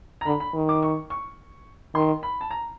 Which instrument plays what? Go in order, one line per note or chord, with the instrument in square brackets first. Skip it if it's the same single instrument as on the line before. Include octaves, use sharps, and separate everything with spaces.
[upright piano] A#5
[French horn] D3 [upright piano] B5
[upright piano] B5
[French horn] D#3
[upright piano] D6
C#6
C#6
[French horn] D#3 [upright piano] C6
[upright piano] B5
A5
A#5